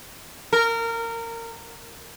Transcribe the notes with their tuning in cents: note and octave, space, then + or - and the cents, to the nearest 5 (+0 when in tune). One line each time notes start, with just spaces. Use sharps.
A#4 -20